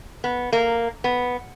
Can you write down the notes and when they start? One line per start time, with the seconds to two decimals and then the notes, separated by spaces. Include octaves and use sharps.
0.24 B3
0.53 A#3
1.04 B3